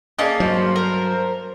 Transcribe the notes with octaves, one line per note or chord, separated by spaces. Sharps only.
A#3 C#4 G#4 D5 D#5 A5
G2 F#3 C5
A#4